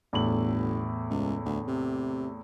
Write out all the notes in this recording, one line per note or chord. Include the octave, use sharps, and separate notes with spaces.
G1 E2 A2 F#7
C#2
D2
C3